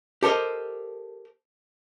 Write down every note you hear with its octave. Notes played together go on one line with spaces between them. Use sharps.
G4 A4 A#4 C5 D#5